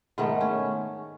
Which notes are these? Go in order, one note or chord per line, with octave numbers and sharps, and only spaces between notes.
G#2 D#3 A3 B3
C#4